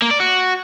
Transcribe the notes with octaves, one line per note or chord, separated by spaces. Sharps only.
A#3
D5
F#4